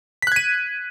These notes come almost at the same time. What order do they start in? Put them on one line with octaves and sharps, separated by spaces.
B6 F#6 G#6 D#7